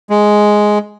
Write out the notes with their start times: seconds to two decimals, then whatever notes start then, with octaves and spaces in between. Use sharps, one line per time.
0.10 G#3